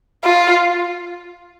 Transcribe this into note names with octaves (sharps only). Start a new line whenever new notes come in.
F4